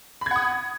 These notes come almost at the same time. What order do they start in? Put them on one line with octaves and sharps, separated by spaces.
B5 G#6 F#5 D#6